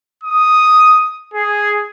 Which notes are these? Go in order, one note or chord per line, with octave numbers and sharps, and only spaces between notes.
D#6
G#4